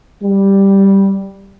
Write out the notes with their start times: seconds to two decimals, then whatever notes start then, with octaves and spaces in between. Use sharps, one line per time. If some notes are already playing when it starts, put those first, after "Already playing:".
0.22 G3